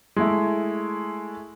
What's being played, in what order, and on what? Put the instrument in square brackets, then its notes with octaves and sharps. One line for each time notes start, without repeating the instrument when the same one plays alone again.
[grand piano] G#3 A3 E4